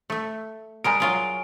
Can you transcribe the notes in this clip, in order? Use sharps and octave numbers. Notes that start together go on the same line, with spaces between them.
A3 E5
G3 G#3 A#4 G#5 D7
F#3 F4 G#4